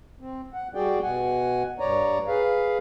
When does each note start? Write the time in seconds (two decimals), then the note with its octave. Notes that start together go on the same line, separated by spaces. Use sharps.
0.21 C4
0.54 F#5
0.75 G3 F#4 G#4 D5 G5
1.02 B2 F#5 G#5
1.80 G2 C#5 D5 A#5
2.28 G#4 B4 F5